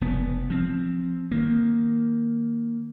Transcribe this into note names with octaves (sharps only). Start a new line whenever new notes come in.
F1 B3
F3 C4
D#3 A#3